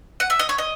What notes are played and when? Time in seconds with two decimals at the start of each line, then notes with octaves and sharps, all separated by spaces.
0.20 F#5
0.30 E5
0.39 D#5
0.49 C#5
0.58 D#5